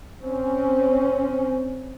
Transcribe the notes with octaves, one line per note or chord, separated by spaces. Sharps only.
C4 C#4